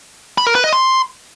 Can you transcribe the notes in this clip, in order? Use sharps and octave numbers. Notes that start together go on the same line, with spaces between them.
B5
A#4
B4
D#5
C6